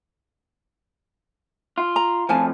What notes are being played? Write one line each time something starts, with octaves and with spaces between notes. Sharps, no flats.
F4
A#5
F2 A2 F3 F4 G#5 A5